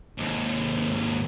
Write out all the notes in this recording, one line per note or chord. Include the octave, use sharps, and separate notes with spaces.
D#2 G#2